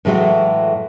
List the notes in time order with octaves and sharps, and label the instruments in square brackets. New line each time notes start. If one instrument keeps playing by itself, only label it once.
[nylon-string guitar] A2 E3 F#3 G#3 A3 F#4